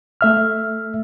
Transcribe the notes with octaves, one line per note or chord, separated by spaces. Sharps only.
A3 E5 F6